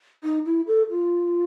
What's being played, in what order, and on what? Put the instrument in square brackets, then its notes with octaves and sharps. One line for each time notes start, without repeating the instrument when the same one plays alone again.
[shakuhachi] D#4
E4
A4
F4